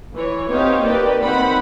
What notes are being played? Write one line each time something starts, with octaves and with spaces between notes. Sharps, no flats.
E3 C#5
B3 C4 D#4 G4 C#5 F5
A#3 G4 B4 D5
D#3 C4 F#5 B5